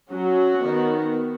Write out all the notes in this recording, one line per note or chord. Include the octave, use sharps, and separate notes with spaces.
F#3 C#4 F#4
D#3 B3